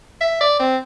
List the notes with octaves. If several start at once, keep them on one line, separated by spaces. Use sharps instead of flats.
E5
D5
C4